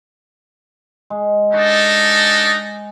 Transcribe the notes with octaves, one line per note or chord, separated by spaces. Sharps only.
G#3
D4 D#4 A4 C#6